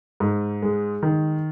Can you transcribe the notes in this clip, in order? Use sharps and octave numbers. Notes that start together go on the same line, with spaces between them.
G#2
G#3
D#3